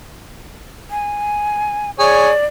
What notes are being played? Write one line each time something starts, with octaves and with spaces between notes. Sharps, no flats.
G#5
G#4 C#5 D5